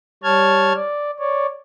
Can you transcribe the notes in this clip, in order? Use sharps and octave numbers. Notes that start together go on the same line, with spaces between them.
G3 C#5 A5 F6 G#6
D5
C#5 D5